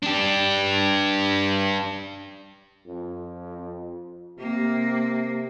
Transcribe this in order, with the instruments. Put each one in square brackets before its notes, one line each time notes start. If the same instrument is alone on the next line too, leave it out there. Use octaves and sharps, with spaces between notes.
[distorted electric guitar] D4 G4
[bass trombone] F2
[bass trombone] C3 [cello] A#3